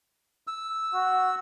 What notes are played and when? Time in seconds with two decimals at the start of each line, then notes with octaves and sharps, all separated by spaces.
0.47 E6
0.94 F#4